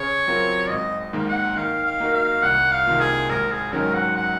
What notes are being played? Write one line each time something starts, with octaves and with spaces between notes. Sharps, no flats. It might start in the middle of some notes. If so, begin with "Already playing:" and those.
Already playing: C#3 C#5
F#3 C4 F4 A#4
G#1 D#5
G#2 D#3 A#3
F#5
D#3 F5
F5
A#3 D#4 F#4 A#4
F5
C2 F#5
F5
C3 D#3 A#3 F4
G#4
G#1 A#4
G#4
G#2 D#3 F#3 C#4 A#4
F#5
F#5